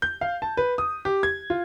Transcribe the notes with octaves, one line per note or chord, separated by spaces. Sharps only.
G6
F5
A5
B4
D#6
G4
G#6
F4